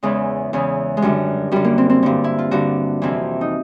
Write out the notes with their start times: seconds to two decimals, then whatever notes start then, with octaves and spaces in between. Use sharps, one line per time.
0.03 E2 C#3 E3 G#3
0.53 E2 C#3 E3
0.97 G#3
1.02 F#2 D3 G3
1.51 F#2 D3 G3
1.65 A#3
1.78 C4
1.90 C4
2.03 G2 D3
2.24 E4
2.38 F4
2.51 G2 D3 F#4
3.02 F2 C3 E3
3.41 D#4